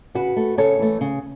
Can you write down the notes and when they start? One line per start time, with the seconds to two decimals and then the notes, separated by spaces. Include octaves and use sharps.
0.15 C#3 F#4 B4
0.37 A3
0.58 C#3 A4 C#5
0.79 E3 A3
1.01 C#3